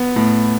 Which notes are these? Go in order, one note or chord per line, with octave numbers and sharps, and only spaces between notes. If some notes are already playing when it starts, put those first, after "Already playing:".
Already playing: B3
A2